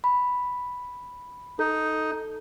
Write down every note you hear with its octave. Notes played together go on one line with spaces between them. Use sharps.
B5
D#4 A4